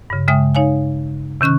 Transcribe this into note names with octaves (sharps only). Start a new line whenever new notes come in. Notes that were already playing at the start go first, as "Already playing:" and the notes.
G2 C#3
C#3 G#3 E5 G5 D#6
D#4 C#5 F5 G#5
C3 D#3 C#4 C#6 F#6